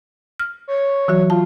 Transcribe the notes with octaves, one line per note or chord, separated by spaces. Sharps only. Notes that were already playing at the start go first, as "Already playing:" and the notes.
F6
C#5
E3 F#3 F#4
F4 A5